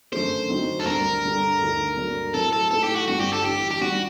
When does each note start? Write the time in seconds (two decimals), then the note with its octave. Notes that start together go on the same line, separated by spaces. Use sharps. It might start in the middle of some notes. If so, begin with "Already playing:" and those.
0.12 F#2 D3 A3 C5
0.49 D3 F#3 C4 D#4
0.80 A4
0.87 D2 D3 G3 A#4
1.24 G2 D3 G3 D4 A4
1.60 D2 D3 A3 D#4 A4
1.97 G2 F#3 A#3 D4 A4
2.34 A2 F#3 C4 A4
2.53 A4
2.71 A2 A3 D#4 A4
2.83 G4
2.96 F#4
3.07 G1 G2 D3 G3 C4 F#4
3.20 G4
3.33 A4
3.45 A1 G2 D3 G4
3.71 G4
3.81 G2 D#3 G3 F#4